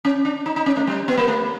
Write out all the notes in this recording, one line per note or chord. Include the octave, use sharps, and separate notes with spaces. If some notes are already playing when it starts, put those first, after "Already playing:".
C#4
D4
D#4
D#4
C#4
A3
G3
B3
A#3
A3